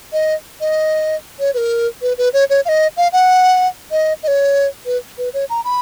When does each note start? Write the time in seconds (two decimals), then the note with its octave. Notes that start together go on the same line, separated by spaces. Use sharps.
0.13 D#5
0.61 D#5
1.39 C#5
1.54 B4
1.57 A#4
2.02 B4
2.18 B4
2.33 C#5
2.50 C#5
2.65 F5
2.69 D#5
2.97 F5
3.13 F#5
3.91 D#5
4.23 D#5
4.28 C#5
4.86 B4
5.18 B4
5.34 C#5
5.50 A#5
5.64 B5